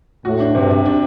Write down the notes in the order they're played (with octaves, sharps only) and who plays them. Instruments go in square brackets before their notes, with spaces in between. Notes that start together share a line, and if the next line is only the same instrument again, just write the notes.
[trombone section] A2 [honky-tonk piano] F#4
[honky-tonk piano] D4
[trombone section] G2 [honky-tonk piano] C3
[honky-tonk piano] C3
D4